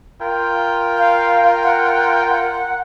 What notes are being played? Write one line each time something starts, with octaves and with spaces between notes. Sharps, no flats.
F4 A#4 G5
F5
F#5
F#5